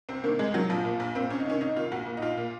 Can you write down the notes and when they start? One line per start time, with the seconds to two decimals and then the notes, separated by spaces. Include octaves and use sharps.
0.09 C2 C4
0.24 C3 D#3 A#3
0.39 C2 G#3
0.54 C3 D#3 F#3
0.70 A#1 F3
0.85 A#2
1.00 A#1
1.15 A#2 C4
1.30 C2 C#4
1.40 D#4
1.46 C3 D#3 C#4
1.61 C2 D#4
1.76 C3 D#3 F4
1.92 A#1 F#4
2.06 A#2
2.17 D#4
2.22 A#1 F4
2.37 A#2